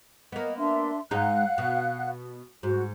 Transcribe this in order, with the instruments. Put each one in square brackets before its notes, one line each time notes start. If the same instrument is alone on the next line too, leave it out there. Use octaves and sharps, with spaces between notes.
[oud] A#3 B3 [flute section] D#5
[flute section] D4 E5 C6
[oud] G#2 G#3 D#4 [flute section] F5 F#5 F#6
[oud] B2
[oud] G#2 [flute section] F#4